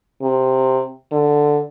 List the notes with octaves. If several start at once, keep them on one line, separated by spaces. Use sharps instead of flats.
C3
D3